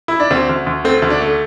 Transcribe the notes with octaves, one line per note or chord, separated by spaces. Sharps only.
E4
D4
D2 C4
D2
D2
A3 C4
D2
D4
A3